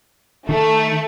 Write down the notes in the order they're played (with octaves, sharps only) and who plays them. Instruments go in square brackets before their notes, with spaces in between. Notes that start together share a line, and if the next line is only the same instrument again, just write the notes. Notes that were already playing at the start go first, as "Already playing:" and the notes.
[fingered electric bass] D#3 [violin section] A3